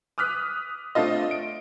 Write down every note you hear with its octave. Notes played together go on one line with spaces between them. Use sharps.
D6 D#6 F6 F#6 B6
A3 C4 D4 F4 D#5
D7